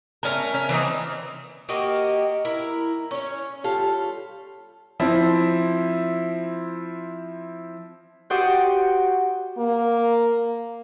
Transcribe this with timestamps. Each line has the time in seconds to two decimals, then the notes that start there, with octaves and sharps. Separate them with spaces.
0.23 A3 C#4 G#4 A#4
0.54 C#4
0.69 E3 A#3 C4 D#4
1.69 A#3 F#4 G4 D#5
2.45 E4 A#4
3.11 C#4 C#5
3.64 G3 F4 A4
5.00 F3 C4 E4
8.30 F#4 G4 C5 D5 F#5 D#6
9.58 A#3